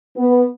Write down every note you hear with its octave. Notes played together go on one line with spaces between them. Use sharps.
B3